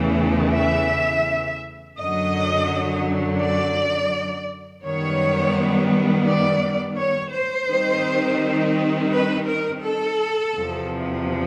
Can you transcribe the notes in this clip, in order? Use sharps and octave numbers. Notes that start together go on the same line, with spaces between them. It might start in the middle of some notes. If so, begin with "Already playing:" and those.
Already playing: E2 C#3 E3 A3
E5
F#2 D3 F#3 D#5
D5
F#2 D#3 G3 B3 C#5
D5
C#5
C5
D#3 G3 C4 D#4
B4
A#4
A4
E2 C3 F3